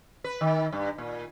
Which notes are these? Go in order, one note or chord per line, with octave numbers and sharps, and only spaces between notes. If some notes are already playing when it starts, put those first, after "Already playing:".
B4
D#3
G2
A#2